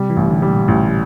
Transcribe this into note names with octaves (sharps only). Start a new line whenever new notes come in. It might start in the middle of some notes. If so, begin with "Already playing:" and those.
Already playing: C3 G3
E3
A1
D3
G3
A#2
A1